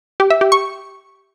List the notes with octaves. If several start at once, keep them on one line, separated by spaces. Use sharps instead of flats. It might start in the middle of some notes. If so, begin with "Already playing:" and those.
G4
E5
G4
C#6